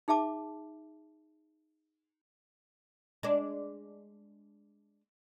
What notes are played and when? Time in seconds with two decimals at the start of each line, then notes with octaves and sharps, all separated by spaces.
0.08 D#4 G#4 E5 A5 D6
3.23 G#3 D4